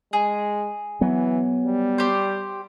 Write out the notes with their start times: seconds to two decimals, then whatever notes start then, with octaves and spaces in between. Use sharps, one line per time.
0.13 G#3 G#4
1.01 E3 F#3 B3
1.66 G3
1.98 G4 C5